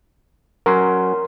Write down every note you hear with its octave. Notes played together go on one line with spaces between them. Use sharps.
F#3 C#4 A#4 C6